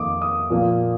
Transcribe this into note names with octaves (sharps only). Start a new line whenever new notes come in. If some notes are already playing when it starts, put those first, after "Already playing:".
Already playing: F2 D#3 A#3 D6 D#6
D#6
A#2 F3 A#3